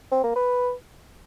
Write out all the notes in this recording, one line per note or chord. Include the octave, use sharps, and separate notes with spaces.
C4
A#3
B4